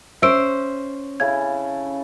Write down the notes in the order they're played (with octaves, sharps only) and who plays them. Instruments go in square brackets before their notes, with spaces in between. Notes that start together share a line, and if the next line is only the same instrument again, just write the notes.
[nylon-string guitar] C#4 C5 [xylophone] E5 E6 D7
[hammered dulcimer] C#3 E4 A4 [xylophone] G#6